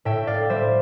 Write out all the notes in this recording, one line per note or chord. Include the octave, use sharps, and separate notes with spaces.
A2 E5 G5
D5 F5
G3 C5 E5